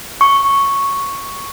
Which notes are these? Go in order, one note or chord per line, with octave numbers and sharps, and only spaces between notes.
C#6